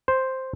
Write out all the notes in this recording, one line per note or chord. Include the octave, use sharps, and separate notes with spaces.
C5